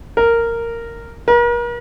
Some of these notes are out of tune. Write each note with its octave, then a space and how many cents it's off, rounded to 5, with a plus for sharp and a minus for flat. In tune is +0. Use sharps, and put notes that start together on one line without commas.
A#4 -10
A#4 +40